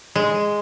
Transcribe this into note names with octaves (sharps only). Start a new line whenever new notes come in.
G#3